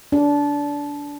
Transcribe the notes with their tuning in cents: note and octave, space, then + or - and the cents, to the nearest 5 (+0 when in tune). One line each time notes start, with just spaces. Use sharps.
D4 -20